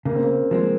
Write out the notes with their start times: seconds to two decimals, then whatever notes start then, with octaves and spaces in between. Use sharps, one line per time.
0.05 C#3 A#3
0.15 C4
0.23 A#3
0.51 F3 G#3 A#3 C4